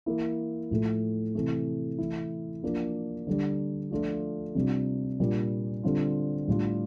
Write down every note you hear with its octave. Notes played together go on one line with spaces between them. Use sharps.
E3 A#3 E4
A2 F3 A3 E4
C3 E3 A3
E3 A3 E4
F3 A#3 D4
D3 G3 D4
F3 A3 D4 F4
C3 G3 D4 F4
A#2 G3 D4
D3 G3 C4 F4
A2 G3 D4 F4